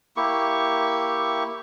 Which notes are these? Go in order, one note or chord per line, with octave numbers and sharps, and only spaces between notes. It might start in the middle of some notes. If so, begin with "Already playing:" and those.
A#3 E4 G4 C#6